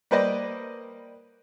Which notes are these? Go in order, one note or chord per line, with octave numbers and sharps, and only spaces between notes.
G3 A#3 B4 C5 D5 D#5